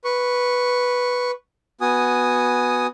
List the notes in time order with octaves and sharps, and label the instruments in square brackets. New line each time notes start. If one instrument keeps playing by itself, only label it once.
[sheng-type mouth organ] B4 C#6
B3 F#4 G#5 D#6